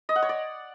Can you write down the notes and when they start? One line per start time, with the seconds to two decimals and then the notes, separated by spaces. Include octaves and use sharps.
0.09 D#5
0.16 F#5
0.22 C#5
0.29 D5